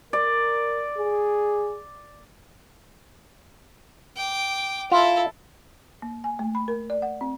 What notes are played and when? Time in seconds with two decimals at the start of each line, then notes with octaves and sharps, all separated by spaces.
0.13 A#4 D5
0.98 G#4
4.16 G5 D6
4.92 E4 F4 A4
6.02 A#3
6.24 G#5
6.39 A3
6.55 B5
6.68 A#4
6.90 D5
7.02 F#5
7.21 C4